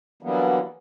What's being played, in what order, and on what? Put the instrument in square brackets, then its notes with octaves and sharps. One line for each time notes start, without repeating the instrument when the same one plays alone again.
[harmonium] D3 E3 F#3 G3 A#3 B3